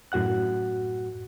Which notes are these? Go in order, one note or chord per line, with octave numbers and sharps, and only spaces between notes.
F#2 A2 F#4 F#5 F#6